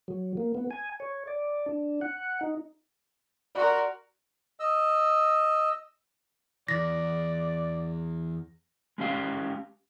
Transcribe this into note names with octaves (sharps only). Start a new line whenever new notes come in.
F#3
A#3
B3
G#5
C#5
D5
D4
F#5
D#4
F#4 A#4 D5 C6
D#5 E6
E2 E3 D5 A#6
G#3 C#4 G4 F5